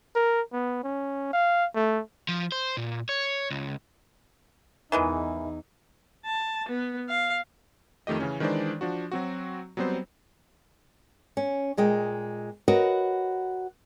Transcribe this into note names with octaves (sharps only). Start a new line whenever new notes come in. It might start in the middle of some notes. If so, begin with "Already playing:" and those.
A#4
B3
C#4
F5
A3
F3
C5
A#2
C#5
C#2
E2 D#3 E3 G#3 D#4
A5
B3
F5
F2 D#3 A3 G4 D#5
C#3 E3 C#4
D#3 E3 G#3 D4 C5 D5
F3 D4 F#4
F#3 C4 F#4
F#3 G3 B3 C4 C5
C#4
A#2 G#3 D#5 G5
F#4 A#4 B4 C#5 D#5